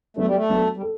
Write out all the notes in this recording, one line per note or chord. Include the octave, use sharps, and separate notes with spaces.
F#3 A3 B3 D4 A4
G3
A3
F#3 B3 D4 A4
G3
A4